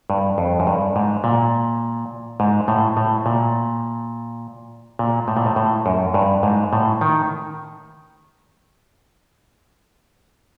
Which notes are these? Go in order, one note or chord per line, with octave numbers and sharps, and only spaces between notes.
G2
F2
F#2
G2
G#2
A#2
G#2
A2
A2
A#2
A#2
A2
A#2
A2
A2
F#2
G2
G#2
A2
D#3